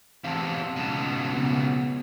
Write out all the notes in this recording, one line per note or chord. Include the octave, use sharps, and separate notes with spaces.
E2 C3 F5 A5
C#2 B2
C#3 B3